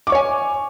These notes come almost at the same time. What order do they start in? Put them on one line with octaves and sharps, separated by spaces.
D6 C#6 C#5 G#5